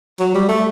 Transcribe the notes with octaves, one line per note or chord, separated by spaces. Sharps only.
F#3
G3
A3